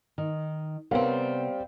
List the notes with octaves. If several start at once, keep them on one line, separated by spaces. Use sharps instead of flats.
D#3
C3 G3 B3 C4 A#4 C#5 F5